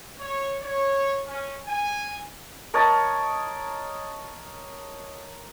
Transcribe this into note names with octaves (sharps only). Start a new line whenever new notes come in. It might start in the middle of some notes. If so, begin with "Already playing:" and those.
C#5
C#5
C#4
G#5
A#4 C#5 D#5 A5